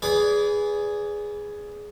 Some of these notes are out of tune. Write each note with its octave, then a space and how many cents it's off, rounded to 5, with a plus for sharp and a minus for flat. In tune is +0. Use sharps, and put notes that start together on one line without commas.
G#4 +0 B4 +0 D5 -30